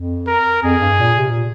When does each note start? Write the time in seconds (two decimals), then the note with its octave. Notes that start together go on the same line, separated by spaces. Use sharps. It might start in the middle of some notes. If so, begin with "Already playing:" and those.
Already playing: F2
0.27 A#4
0.63 F2 G#4
0.81 G2
0.99 A#2
1.17 C3
1.29 A#2